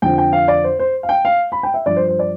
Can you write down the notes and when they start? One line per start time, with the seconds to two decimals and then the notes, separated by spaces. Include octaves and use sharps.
0.02 F2 D3 F3 G5
0.18 G5
0.33 F5
0.48 D5
0.64 C5
0.79 C5
1.03 F5
1.09 G5
1.25 F5
1.52 B5
1.63 G5
1.74 E5
1.86 G2 F3 D5
1.96 C5
2.08 C5
2.19 D5